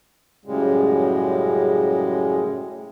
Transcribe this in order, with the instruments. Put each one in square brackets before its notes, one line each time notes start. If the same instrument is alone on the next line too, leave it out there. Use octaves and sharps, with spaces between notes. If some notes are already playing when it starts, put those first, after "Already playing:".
[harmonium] F#2 A2 C#3 G3 G#3